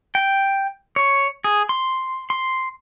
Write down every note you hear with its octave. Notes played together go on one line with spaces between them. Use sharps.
G5
C#5
G#4
C6
C6